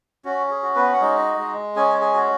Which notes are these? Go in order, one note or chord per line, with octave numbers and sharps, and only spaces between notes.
C#4 F#4
G#4
F#4
B3 B4
F#5
G#3 D#4 D#5
G#3
C#4 G#4 G#5
G#4 G#5
F#4